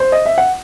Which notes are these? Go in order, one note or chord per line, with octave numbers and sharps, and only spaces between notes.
C5
D#5
E5
F#5